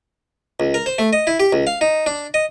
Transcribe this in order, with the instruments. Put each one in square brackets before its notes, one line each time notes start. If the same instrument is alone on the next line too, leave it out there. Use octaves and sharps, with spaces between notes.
[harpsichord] C#2
A#4
C5
A3
D#5
E4
G4
C#2
F5
D#4
D4
D#5